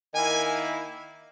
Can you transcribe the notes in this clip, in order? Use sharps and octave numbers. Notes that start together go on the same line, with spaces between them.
D#3 A#3 E4 G#5